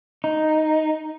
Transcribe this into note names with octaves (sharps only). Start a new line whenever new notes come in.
D#4